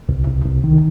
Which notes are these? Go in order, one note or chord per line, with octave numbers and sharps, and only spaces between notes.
C2
C2
C2
D#3